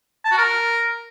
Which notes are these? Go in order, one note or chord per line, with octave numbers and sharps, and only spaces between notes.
A5
F#4
A#4